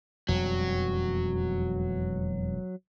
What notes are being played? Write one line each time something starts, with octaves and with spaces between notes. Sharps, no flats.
E1 F2 F#3 G3